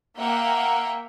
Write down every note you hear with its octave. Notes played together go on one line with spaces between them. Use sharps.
A#3 E5 F#5 G5